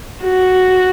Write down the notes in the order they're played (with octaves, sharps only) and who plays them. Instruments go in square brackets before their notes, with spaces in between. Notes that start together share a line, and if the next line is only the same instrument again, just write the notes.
[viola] F#4